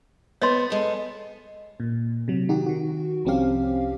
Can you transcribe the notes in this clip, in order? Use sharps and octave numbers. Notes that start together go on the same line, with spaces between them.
B3 C5 C#5 D#5 C6
G#3 A4
A#2
C3 F#3
D#3 D#4 F#4 G4
D#3 F#4
C2 F3 C4 C#4 G4 F5